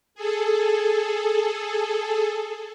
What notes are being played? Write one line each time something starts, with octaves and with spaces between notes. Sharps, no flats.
G#4 A4